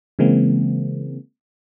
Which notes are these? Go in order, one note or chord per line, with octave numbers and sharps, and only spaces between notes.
C#3 E3 G#3 A#3 C4